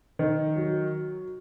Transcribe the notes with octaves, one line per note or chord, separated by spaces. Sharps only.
D#3
F#3